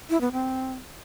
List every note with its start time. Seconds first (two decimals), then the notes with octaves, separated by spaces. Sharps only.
0.10 E4
0.21 B3
0.32 C4